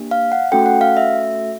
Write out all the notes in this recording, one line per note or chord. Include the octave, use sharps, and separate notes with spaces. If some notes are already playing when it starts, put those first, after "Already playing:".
Already playing: A#3 D4 G4
F5
F#5
A3 C#4 F#4 A4 G5
F#5
F5
E5